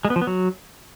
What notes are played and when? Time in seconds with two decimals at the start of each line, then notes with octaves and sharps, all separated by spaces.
0.05 G#3
0.10 B3
0.16 F3
0.21 B3
0.27 F#3